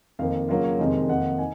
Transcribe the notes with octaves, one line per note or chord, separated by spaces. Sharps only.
F2 D#3 A#3 F5
C#3 F#3 A#3 F4 F5
C#5
F2 C3 D#3 G#3
F2 D#3 A#3 D#4 F#5
D#4 G#5